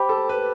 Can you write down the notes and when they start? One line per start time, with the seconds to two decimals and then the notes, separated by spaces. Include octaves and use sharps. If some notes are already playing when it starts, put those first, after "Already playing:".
Already playing: G4 C5 G5 B5 D6
0.09 A4
0.29 B4